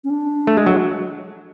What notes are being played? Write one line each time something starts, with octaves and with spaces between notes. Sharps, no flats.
C#4
D4
A3
G#3
F#3